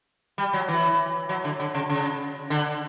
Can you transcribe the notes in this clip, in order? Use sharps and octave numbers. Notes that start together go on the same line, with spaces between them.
G3
F#3
E3
F#3
D3
D3
C#3
C#3
D3